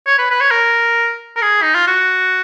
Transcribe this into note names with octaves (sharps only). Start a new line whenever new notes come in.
C#5
B4
B4
C#5
A#4
A#4
G#4
D#4
F4
F#4